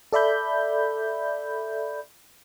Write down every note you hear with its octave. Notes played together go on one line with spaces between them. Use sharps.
A4 D5 E5 B5 G6